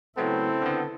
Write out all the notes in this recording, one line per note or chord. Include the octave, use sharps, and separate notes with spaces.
C#3 F#3 A3 B3 C4 E4 A4
D3 B3